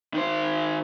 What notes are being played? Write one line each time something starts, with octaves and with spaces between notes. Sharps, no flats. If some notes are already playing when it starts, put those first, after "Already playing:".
D#3 C5